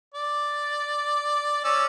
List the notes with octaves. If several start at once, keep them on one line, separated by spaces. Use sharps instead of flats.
D5
C#4 D5 E6